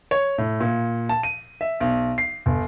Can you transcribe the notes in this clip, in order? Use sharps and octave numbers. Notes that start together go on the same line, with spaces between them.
C#5
A2
A#2
A5
D#7
E5
B1
C7
G1